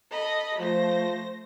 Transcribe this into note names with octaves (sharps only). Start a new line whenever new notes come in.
A4 D#5 B5
F3 A3 C5 A#6